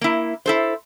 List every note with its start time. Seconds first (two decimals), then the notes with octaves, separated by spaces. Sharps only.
0.01 A#3 E4
0.46 E4 A4 C5